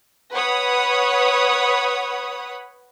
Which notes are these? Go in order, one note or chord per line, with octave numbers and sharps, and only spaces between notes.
B4 C#5 F#5 B5 D#6